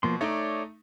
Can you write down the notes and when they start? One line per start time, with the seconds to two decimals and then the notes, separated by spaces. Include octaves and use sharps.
0.03 B2 F3 A#3 C6
0.21 A3 D#4 C#5 D5